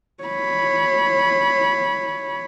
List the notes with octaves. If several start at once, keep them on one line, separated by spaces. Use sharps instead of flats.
C#5 B5